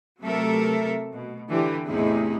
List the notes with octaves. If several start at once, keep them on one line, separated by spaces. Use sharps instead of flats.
C3 F#3 A3 A4 A#4 E5
B2
D3 E3 G4
E2 A2 C3 D#4 E4 G#4